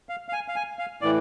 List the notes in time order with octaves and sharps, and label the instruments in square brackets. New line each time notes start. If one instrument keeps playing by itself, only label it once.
[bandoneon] F5
F5
G#5
F5
G#5
F5
A2 E3 D5